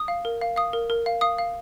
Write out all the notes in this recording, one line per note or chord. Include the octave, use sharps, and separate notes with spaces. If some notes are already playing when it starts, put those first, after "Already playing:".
Already playing: D#6
F5
A#4
F5
F5 D#6
A#4
A#4
F5
F5 D#6
F5